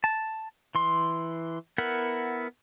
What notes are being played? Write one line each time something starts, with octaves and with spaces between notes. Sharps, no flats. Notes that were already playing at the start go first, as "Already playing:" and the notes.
A5
E3 C6
B3 E4 A#4 F#5